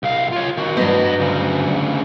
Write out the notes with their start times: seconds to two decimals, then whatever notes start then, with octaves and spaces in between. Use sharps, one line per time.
0.03 C2 F5
0.32 F4 C#5
0.57 D#3 F#4
0.77 G2 F#3 B3 C5 D#5
1.20 D2 C#3